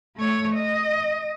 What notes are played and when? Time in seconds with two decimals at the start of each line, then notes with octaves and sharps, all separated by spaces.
0.17 A3 C#5
0.55 D#5